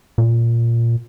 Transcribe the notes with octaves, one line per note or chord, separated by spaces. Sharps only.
A#2